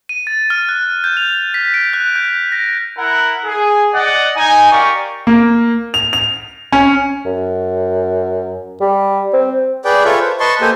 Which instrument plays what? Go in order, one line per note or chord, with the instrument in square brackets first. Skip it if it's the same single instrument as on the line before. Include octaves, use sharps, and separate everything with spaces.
[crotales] D#7
A6
F6
F#6
G6
F7
B6
D7
F#6
G6
A#6
[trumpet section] E4 A#4 F#5
G#4
D5 D#5 F#5
D#4 G#5
G4 A#4 D5 F5 C#6
[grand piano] A#3
F7
F7
C#4
[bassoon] F#2
G3
C4
[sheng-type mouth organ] G#4 B4 D5 G5
F4 A4 B4 C#5 E5
C5
B4 D#5 A5 C6 C#6
A#3 G4 A4 C5 D#5 G#5